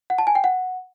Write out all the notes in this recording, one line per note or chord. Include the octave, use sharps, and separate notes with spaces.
F#5
A5
G#5
G5
F#5